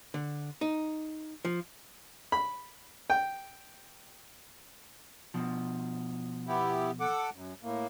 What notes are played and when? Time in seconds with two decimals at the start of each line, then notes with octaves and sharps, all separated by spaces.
0.14 D3
0.61 D#4
1.45 F3
2.32 B5
3.10 G5
5.34 B2 F3
6.48 B3 E4 G4
7.00 A4 F#5 D6
7.34 F#2
7.63 A2 A#3